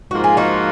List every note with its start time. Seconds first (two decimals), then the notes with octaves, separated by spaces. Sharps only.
0.10 G#2 F3 A#3 F4 F#4
0.24 G#4
0.37 D#4 F#4